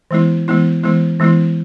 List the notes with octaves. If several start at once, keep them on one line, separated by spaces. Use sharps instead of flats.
E3 G#3 B3 E4
E3 G#3 B3 E4
E3 G#3 B3 E4
E3 G#3 B3 E4